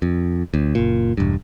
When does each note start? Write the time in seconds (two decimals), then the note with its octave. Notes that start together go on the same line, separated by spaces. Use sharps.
0.02 F2
0.54 D2
0.75 F#1 A#2
1.17 E1 G2